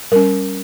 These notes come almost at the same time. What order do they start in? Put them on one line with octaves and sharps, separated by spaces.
G3 A#4 C#4